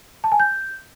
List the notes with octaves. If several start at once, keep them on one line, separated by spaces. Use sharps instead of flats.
A5
G#5
G6